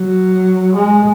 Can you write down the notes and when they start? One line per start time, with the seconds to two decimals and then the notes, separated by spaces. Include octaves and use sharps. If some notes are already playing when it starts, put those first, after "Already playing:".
Already playing: F#3
0.76 G#3